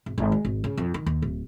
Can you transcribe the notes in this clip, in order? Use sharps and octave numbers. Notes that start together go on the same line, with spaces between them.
G#1
G#1
G#3
G#1
C#3
F2
D#3
D#2
D1